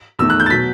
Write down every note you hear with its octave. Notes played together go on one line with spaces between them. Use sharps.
E2 D#3 A3 E6
F#6
G6
A6
B2 F#3 B6